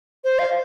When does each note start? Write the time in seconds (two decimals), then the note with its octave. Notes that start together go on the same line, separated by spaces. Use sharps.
0.24 C5
0.39 F5